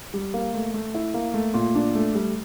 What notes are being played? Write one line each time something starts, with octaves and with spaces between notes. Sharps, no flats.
G3
A#3
A3
A3
E4
A#3
A3
A#2
D4
A3
G3